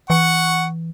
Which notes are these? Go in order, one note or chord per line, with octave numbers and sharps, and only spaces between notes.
E3 F#5 C#6